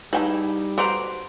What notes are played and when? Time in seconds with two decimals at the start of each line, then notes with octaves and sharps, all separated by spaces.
0.13 G3 D#4 E4 G#4 B4 G5 A5
0.78 F#4 A4 B4 C5 A#5 C6 D6 D7